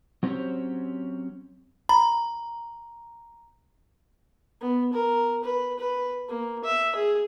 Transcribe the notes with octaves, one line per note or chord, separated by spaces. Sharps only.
F#3 C4 C#4 G4 C5 C#5
A#5 B5
B3
A#4
B4
B4
A#3
E5
G#4